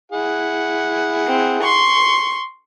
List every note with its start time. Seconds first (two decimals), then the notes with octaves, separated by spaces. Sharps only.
0.12 E4 G#4 F#5
1.28 C4
1.62 C6 C#6